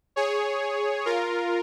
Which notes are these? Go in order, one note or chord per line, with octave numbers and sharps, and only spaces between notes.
G#4 C#5
F4 A#4